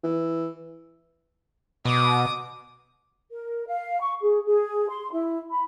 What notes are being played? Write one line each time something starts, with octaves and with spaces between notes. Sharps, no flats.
E3
B2 D6 D#6
A#4
F5
C#6
G#4
G#4
C6
E4
B5